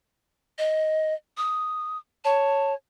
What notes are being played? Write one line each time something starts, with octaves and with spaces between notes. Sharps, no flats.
D#5
D#6
C#5 A5